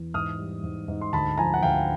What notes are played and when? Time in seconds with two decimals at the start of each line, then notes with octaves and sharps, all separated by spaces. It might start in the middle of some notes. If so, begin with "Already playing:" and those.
Already playing: E2
0.14 G#2 D#6 F6
0.39 G3
0.63 G#2
0.88 G#2
1.01 C6
1.13 D2 A5 B5
1.38 F3 G#5 A#5
1.54 F#5
1.63 D2 F5 G5